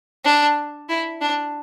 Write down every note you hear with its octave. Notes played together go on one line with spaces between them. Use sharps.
D4
E4
D4